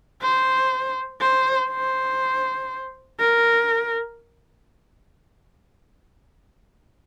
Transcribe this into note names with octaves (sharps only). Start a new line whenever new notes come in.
C5
C5
C5
A#4